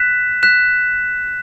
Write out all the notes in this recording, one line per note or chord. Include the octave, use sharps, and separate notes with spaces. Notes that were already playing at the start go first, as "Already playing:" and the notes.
Already playing: F#6 B6 E7
F#6 B6 E7